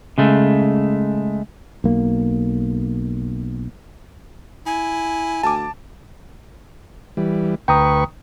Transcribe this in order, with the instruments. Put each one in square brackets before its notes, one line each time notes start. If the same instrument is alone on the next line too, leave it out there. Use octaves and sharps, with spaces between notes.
[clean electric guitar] C#3 G#3 A3
[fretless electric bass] B1 A#3
[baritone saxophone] E4 [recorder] G#5
[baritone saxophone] D2 [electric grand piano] A5 D6
[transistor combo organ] E3 G3
[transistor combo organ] D2 B4 C#6 [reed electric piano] G5 A#5 D#6